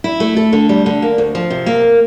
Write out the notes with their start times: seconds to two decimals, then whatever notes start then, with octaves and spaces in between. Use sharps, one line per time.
0.04 E4
0.20 A3
0.37 A4
0.53 D3
0.69 G3
0.86 D3
1.02 A#3
1.18 D2
1.35 F3
1.50 C3
1.66 A#3